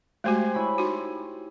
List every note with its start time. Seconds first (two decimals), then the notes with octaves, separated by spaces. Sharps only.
0.24 G#3 A3 F#4 G4 C5 G#5
0.54 E4 C#5 B5
0.78 D#4 F#4